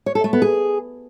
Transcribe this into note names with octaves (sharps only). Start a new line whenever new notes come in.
C#5
A4
A3
B3
G#4